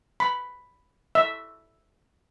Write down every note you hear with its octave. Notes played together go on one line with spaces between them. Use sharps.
B5
E5